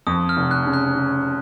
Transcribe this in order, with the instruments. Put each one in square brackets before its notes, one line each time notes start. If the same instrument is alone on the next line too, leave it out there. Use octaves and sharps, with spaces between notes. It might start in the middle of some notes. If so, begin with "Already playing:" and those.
[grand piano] F2 [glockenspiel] D#6
[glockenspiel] F6
[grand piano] F1
[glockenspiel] F#6
[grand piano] C#3
[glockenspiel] F#6
[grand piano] C#3